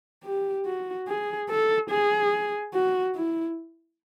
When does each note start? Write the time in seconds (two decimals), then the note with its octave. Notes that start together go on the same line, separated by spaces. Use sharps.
0.24 G4
0.66 F#4
1.08 G#4
1.49 A4
1.90 G#4
2.74 F#4
3.15 E4